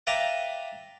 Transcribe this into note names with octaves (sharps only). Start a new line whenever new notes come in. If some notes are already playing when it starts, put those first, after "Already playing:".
B4 D5 E5 F5 G5 A#5